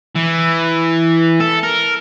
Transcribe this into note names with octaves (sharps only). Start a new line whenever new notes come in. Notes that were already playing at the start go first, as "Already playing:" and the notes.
E3
A4
A#4